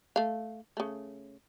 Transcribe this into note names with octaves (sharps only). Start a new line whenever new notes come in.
A3 F5
C#3 A3